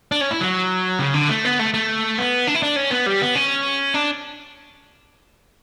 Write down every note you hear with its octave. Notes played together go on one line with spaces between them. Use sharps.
D4
C#4
E4
F#3
C#3
D3
A3
B3
A3
A3
B3
D4
E4
D4
C#4
B3
G3
B3
C#4
D4